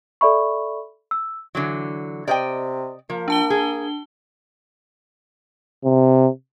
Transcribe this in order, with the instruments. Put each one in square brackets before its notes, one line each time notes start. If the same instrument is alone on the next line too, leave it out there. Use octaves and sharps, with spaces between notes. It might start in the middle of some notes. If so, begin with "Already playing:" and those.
[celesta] A4 D5 E5 B5 C#6
E6
[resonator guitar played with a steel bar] D3 E3 F#3
[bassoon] C3 [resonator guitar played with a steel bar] D5 D#5 G5
[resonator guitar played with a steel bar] F3 [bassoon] A#3
[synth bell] D4 A5 G7
[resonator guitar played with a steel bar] G#4
[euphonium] C3